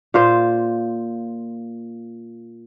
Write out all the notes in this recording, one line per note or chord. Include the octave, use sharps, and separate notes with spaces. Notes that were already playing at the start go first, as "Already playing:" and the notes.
A#2 F4 C5